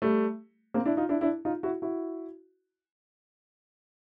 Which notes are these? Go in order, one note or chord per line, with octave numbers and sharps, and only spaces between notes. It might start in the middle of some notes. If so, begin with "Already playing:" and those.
G3 A3
A#3 C4
D4 E4
D#4 F4
D4 E4
D4 E4
D#4 F4
E4 F#4
E4 F#4